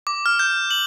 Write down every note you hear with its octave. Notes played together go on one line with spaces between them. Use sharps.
D6
F6
G6
F#7